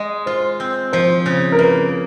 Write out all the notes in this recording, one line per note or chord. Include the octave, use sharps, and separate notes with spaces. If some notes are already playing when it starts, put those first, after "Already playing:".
Already playing: G#3
F4 C5
C4
F3 C5
C#3
A#4
A#3 B4